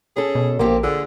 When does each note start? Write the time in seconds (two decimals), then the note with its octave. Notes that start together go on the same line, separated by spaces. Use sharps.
0.16 C#4 G#4 A4
0.35 B2
0.59 A#1 F3 A#3 C4 G4
0.83 D3 F4 G#4